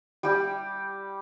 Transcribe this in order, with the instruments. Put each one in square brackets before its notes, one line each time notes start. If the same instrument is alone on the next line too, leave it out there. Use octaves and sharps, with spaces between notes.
[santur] G3 G4